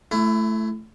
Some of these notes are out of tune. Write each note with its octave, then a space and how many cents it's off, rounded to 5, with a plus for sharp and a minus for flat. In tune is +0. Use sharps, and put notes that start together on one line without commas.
A3 -10 E4 +25